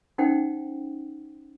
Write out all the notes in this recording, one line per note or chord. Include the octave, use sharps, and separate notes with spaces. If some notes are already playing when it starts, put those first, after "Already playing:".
C#4 D#4 C5 F#5 G5